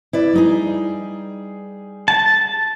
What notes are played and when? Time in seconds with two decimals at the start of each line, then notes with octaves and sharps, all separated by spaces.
0.13 E4 B4 D5
0.33 G3 D#4 G#4
2.08 A5